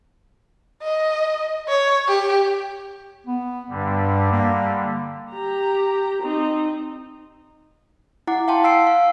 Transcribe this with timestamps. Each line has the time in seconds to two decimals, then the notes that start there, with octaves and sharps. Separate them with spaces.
0.83 D#5
1.68 C#5
2.08 G4
3.27 B3
3.70 G2 D3 G3
4.32 A#3
5.31 G4 A#5
6.23 C4 D#4
8.27 E4 F#5 D6
8.48 F5 G5 A5 C6
8.64 F5 E6 C7 D7
8.87 F5